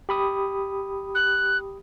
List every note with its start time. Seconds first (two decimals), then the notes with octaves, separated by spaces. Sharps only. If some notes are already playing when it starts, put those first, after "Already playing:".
0.09 G4 B5 D#6
1.15 F#6